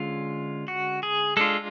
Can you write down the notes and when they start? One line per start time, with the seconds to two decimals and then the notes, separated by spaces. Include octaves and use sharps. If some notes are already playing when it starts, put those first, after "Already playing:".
Already playing: D3 G#3 C#4 F4
0.68 F#4
1.03 G#4
1.37 G#3 D4 F4 A4